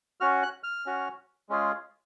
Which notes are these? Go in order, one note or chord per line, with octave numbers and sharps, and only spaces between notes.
C#4 F#4 F6
F#6
F6
C#4 F#4
G#3 C#4 F4 G#4